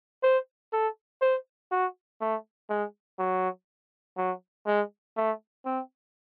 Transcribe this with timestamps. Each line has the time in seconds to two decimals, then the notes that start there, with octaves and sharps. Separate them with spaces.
0.23 C5
0.73 A4
1.21 C5
1.71 F#4
2.21 A3
2.69 G#3
3.19 F#3
4.17 F#3
4.66 G#3
5.17 A3
5.65 C4